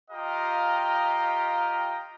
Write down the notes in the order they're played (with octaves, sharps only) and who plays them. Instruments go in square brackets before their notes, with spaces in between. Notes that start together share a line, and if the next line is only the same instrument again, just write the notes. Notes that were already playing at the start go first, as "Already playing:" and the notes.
[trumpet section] F4 G4 D#5 F5 G5 A#5